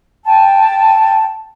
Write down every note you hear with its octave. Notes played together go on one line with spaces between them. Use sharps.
G5 A5